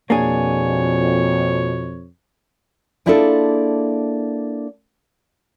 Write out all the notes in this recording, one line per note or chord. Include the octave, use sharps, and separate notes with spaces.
F2 B2 A#3 D4 G#4 C#5
A#3 D4 E4 F4 G#4 A4